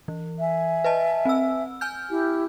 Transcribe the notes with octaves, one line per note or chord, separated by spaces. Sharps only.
E3
E5 G#5
B4 D#5 A5
C4 E6
G#5 F6 G6
E4 G4